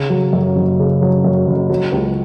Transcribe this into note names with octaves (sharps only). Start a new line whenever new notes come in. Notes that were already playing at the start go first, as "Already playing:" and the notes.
Already playing: C#3
F#3
F#2
F#1
C#3
F#3
F#2
F#1
F#3
C#2